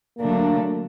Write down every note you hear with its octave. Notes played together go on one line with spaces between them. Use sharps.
D3 F#3 A3 A#3 D4